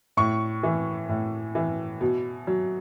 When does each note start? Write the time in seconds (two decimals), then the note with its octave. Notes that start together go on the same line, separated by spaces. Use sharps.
0.17 A2 C#6
0.63 E3
1.09 A2
1.55 E3
2.01 B2
2.47 F#3